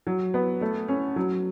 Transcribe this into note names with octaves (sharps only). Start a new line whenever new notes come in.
F#3
B3
A3
C#4
F#3